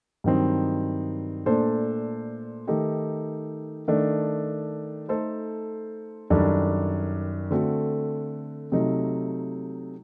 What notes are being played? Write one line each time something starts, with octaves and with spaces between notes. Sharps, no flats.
G2 D#3 F#3 C4 D#4
A#2 A3 D4 A4 C5
D#3 A3 D#4 G4
D#3 A3 D4
A3 D#4 A4 C5
F#2 D#3 G3 D4 A4
D3 A3 C4 F#4
C3 F#3 A3 D#4